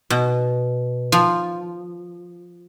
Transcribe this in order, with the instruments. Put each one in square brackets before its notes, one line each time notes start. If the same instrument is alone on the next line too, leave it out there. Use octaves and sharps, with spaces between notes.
[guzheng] B2
F3